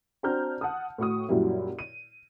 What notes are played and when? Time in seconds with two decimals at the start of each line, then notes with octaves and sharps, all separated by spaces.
0.23 C4 D4 F#4 A#5 F6 G6
0.61 F#5 A5 D#6
0.98 A2 F#4 C#6 D#6
1.29 F#2 A#2 F#3 G3 E4
1.79 D#7